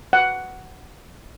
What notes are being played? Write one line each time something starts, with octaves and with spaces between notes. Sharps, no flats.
F#5